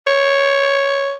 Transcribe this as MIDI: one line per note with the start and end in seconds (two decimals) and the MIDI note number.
0.07 1.15 73